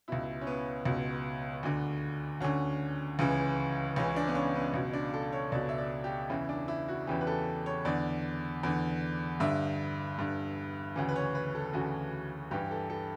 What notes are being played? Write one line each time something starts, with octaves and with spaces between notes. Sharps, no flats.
C#2 B2 E4
C#4
B3
C#2 B2
D2 D3
D2 D3 C#4
C#2 C#3 E3
C#2 C#3 E3 C#4
D4
B3
C#4
B3
C#2 B2
D4
A4
C#5
C#2 B2 D5
E5
D5
G4
E2 C#3 E3 E4
D4
E4
F#4
E2 C#3 E3 G4
B4
A4
C#5
E2 D3 D5
E2 D3
G2 D3 E5
G2 D3
D2 C#3 E3
B4
C#5
B4
A4
D2 C#3 E3 F#4
G2 E3 G4
A4
A4